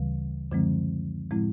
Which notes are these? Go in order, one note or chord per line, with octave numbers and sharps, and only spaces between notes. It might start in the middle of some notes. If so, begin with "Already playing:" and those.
Already playing: D2 C#3 E3 G3
F#2 D3 F3 G#3 C4
A2 F3 G#3 C4 E4